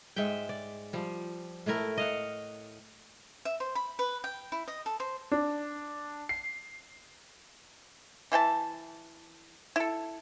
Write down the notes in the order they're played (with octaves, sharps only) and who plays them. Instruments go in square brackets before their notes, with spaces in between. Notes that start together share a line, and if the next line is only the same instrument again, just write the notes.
[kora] G#2 G#3 E5 G5
D5
F3 G3
A2 A3 E4 A#4
D#5 F5 F#5
[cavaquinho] E5
C5
B5
B4
G5
E4
D#5
A4
C5
[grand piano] D4
C7
[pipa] E3 E4 G5 A5
E4 A4